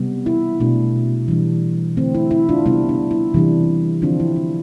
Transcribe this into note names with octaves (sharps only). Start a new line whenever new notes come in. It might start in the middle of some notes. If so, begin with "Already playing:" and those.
Already playing: C3 G3 B3
E4
B2 A3 D4
E3 G3 D4
D3 A3 C4 E4
E4
E4
D4 F4
C3 G3 B3 D4 E4
D4
E4
C3 E3 G3 D4
D3 F3 C4 D4 F4
E4
D4